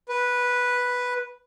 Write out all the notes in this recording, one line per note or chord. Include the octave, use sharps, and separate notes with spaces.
B4